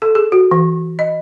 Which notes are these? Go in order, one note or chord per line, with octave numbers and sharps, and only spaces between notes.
A4
G#4
F#4
E3
D#5